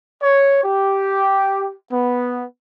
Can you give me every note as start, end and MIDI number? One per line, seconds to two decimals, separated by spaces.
0.23 0.61 73
0.63 1.74 67
1.91 2.42 59